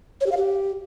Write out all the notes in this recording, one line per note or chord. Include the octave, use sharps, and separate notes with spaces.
C#5
G4
F5
G4